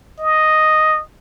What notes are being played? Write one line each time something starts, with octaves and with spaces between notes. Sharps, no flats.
D#5